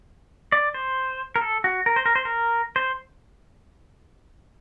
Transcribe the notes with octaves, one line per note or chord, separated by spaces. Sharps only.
D5
C5
A#4
A4
F#4
A#4
C5
A#4
C5
A#4
C5